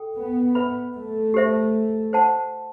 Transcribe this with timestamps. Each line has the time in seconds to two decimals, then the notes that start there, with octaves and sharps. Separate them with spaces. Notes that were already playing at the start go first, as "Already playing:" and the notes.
Already playing: A4 G5
0.16 B3
0.55 B4 E5 B5
0.95 A3
1.34 G4 C5 E5
2.13 C5 F#5 A5